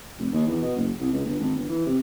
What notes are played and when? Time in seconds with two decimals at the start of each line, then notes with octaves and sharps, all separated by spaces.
0.19 F1
0.33 D#2
0.48 E2
0.62 B2
0.76 F#1
1.00 C2
1.12 C#2
1.26 G1
1.40 G#1
1.56 G1
1.69 E3
1.86 C3